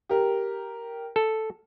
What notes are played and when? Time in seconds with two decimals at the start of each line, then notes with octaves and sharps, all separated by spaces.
0.09 G4 A#4
1.16 A4